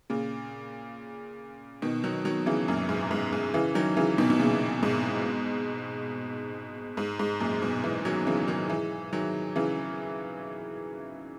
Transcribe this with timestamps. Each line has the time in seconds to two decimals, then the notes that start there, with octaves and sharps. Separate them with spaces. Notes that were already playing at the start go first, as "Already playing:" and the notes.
0.10 A#2 C#3
1.82 B2 D#3
2.04 D#3 F#3
2.25 D#3 F#3
2.46 C#3 E3
2.68 F#2 A#2
2.89 G#2
3.11 G#2
3.33 G#2
3.54 C#3 E3
3.75 D#3 F#3
3.97 C#3 E3
4.18 B2 D#3
4.30 B2
4.39 A#2 C#3
4.83 G#2 B2
6.97 G#2
7.19 G#2
7.40 F#2 A#2
7.62 G#2 B2
7.84 E3 G#3
8.05 D#3 F#3
8.27 C#3 E3
8.48 D#3 F#3
8.69 E3 G#3
9.13 D#3 F#3
9.56 C#3 E3